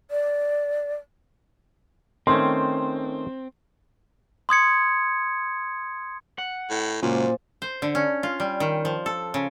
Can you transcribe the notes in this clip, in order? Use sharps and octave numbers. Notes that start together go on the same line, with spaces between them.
D5
D#3 A3 C4 C#4 C6
C6 D#6 G#6 C#7
F#5
A2
C#2 F#2 A#2 C5 D5 F5
C5
D3
C#4
F4
G3
D#3
F3
A4
C#3